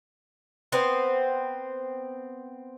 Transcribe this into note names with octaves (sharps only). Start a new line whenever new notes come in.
B3 C4 C5